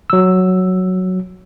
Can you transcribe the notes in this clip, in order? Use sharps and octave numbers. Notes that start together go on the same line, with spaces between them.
F#3 E6